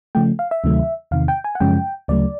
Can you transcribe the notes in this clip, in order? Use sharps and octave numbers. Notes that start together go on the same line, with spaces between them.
C#3 F3 A3 G5
F5
E5
D2 C3 D#3 F#3 A3
E2 C3 D#3 F5
G5
G#5
F#5
F#2 C#3 F3 G#3 C#4 G5
D2 C#3 F#3 A3 D5